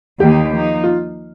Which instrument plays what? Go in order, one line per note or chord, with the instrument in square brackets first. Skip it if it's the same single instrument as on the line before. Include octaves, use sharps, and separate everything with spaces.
[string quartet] D#2 D#3 A#3 D#4 [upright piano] G4
[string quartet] F3 A#3 D#4
[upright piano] F4